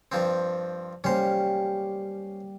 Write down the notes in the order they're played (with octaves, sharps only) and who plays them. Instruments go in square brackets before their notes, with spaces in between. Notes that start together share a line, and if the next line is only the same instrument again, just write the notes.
[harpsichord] G2 F3 C4
[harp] G3 A#3 [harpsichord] C#4 C5